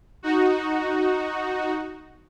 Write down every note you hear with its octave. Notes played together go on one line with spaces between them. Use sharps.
D#4 F#4